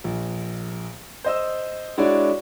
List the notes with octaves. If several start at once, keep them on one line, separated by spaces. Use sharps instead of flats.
A#1
C5 D#5 E6
G#3 D4 E4 F#4 C#5 D5